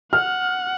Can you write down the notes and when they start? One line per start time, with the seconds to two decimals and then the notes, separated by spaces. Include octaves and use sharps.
0.13 F#5 F6